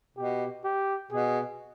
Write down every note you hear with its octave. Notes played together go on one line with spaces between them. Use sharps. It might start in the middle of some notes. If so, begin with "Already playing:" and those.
B2 G4
G4
B2 G#4